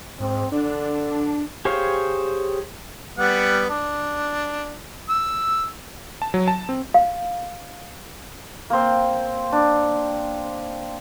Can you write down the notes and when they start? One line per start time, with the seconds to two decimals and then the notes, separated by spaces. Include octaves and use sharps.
0.20 G#2 C4
0.52 D3 D4
1.65 G4 G#4 C5 C#5 F5
3.18 G3 B3 F#5
3.69 D4
5.09 E6
6.22 A5
6.34 F#3
6.48 A5
6.69 C4
6.94 F5
8.70 A#3 C4
9.52 D4